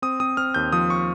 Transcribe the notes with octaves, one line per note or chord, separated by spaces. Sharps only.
C4 D#6
C4 D#6
C4 F6
D#2 G6
F3 D#6
C#6